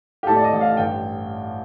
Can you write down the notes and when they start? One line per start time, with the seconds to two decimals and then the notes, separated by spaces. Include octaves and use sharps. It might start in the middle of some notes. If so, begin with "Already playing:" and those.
0.23 G4
0.27 A2 A4
0.36 D5
0.44 D#5
0.52 A1
0.61 F5
0.77 G2 G5